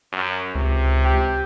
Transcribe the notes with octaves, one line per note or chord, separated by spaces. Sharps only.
F#2
C#2 C3
G4